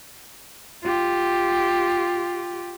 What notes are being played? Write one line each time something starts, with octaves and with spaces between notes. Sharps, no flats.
F4 G4